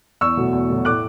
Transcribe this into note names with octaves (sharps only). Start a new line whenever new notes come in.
E2 C#6 E6
B2 F#3 A3
E2
B2 F#3 A3
A2 D6 F#6